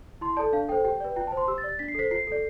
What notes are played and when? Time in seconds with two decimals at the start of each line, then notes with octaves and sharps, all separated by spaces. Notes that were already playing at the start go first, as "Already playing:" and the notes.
0.21 E4 C6
0.37 A4 D5 A5
0.53 D4 F5
0.69 A4 C5 G5
0.84 G4 G5
1.01 B4 D5
1.16 F4 G5
1.27 A5
1.32 C5
1.37 C6
1.48 G4 E6
1.58 A6
1.64 D5
1.69 A6
1.79 D4 B6
1.88 C7
1.95 A4 C5 B6
2.11 F4 C7
2.27 A4 D5